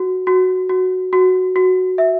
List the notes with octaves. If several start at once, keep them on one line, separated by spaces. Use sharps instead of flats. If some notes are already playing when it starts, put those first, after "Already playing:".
Already playing: F#4
F#4
F#4
F#4
F#4
E5